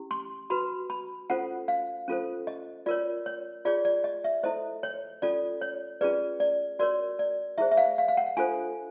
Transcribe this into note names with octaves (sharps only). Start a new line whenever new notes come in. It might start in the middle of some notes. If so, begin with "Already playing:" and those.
Already playing: C#4 E4 G4
C6
F#4 B4 B5
B5
C#4 F4 A4 C5 F#5
F5
C#4 F4 A4 C5
D#5
F4 A#4 C#5 D5
C#5
F4 G#4 C#5 D5
D5
D#5
E5
E4 A4 C5 D#5
C#5
C#4 F4 A4 D5
C#5
C#4 F4 G#4 B4 D5
D5
F#4 A#4 C#5 D5
D5
E4 G#4 C5 E5
E5
F5
F5
F5
F#5
D4 F4 A4 C5 G#5